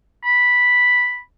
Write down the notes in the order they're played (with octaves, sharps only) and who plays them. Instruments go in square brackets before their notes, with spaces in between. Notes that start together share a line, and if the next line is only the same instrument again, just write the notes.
[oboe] B5